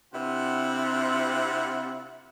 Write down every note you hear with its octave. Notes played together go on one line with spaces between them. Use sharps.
C3 C4 D4 E4 F4 F#5